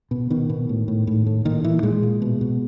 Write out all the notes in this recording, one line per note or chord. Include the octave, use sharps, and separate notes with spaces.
B2
B2 D#3
B2
A2
A2
A2
A2
A#2 D#3
A#2 E3
A#2 G#3
A#2
B2
B2